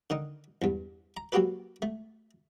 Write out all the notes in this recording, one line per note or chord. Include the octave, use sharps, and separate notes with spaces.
D3 D#3 D#4
E2 G2
A#5
F#3 A#3 F#4 G4 A4 B4
A3